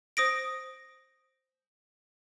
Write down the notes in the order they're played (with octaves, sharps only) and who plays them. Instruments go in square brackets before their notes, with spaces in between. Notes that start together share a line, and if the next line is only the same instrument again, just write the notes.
[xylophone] C5 D#6 A#6 D7